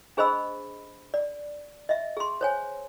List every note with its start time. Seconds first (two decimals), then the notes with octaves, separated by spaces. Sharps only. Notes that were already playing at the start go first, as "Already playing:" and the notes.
0.17 D4 G#4 C5 D#5 B5 E6
1.14 D5
1.89 D#5 E5
2.17 G#4 C6
2.41 C5 C#5 G#5